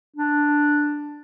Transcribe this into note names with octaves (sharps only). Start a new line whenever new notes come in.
D4